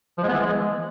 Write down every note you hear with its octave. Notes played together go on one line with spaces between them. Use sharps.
F3
G#3
B3
E3
G#3